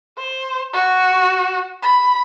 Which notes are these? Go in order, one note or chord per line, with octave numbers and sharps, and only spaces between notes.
C5
F#4
B5